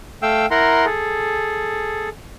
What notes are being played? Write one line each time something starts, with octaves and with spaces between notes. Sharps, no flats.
A3 F5 G5 E6
E4 A#4 F#5 A#5 C6
G#4 A4